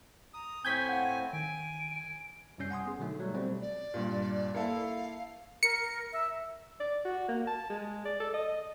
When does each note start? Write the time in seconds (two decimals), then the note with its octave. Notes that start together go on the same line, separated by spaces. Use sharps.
0.34 A#5 D#6
0.65 A2 C4 G#5 C#6 G6 G#6 B6
0.89 F5 F#5
1.33 D#3 G#5 D7
2.58 F#2 C3 G3 C#4 G6 C7
2.70 F#5 G#5 C6 D#6
2.86 B3 G#4
2.99 B2 D3 F#3 A3 D#4
3.20 F#3 G3
3.34 B2 G3 A3 C4 C5
3.61 D5
3.94 G2 A#2
4.55 A#3 E4 A4 F5
5.63 A#4 C#7
6.13 E5
6.80 D5
7.05 F#4
7.29 A#3
7.47 A5
7.69 G#3
8.05 D5
8.20 A4
8.34 D#5